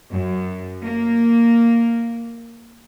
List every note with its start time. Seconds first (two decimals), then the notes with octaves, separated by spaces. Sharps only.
0.12 F#2
0.86 A#3